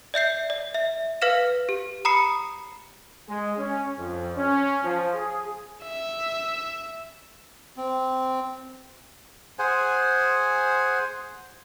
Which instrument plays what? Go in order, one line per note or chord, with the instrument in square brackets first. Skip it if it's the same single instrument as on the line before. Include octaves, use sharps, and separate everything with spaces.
[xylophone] D5 E5 G6 C7
D5
E5
B4 F5 F6 A#6 E7
G4
A#5 B5 D#6 C7 C#7
[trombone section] G#3
C#4
F2
C#4
F3
G#4
[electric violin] E5
[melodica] C4
G#4 C5 F#5 G#5